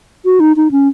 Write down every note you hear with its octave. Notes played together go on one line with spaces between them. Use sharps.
F#4
D#4
D#4
C#4